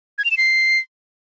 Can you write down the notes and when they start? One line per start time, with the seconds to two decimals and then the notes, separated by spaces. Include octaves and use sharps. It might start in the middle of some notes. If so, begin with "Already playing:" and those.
0.18 G#6
0.25 F7
0.31 E7
0.37 C7